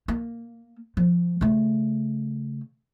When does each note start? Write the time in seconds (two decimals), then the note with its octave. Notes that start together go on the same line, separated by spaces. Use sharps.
0.08 A#3
0.97 F3
1.41 C#3 A3